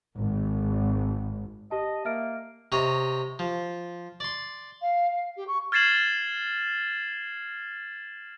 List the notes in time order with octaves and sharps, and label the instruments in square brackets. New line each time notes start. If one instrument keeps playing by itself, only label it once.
[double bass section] G#1
[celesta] G4 A5 [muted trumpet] D#5
[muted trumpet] A#3 [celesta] E5 F6 D7
[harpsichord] C3 C#5 D#5 A#5
F3
D5 C6
[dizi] F5
F5
G4
C#6
[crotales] F6 G#6 A6 C7 E7 F#7